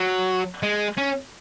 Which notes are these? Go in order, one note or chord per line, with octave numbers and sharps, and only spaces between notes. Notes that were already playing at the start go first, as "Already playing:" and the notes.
Already playing: F#3
G#3
C#4